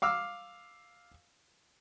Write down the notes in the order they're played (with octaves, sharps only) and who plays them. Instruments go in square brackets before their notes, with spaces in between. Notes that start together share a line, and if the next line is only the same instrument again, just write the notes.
[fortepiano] F5 D6 E6 F6